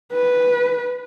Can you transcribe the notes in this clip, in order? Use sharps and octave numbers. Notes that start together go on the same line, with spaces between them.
B4